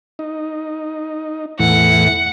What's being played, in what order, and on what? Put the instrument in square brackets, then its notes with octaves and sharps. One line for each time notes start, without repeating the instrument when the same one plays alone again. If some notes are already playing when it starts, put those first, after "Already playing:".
[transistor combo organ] D#4
[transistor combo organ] E2 A2 E3 [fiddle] F#5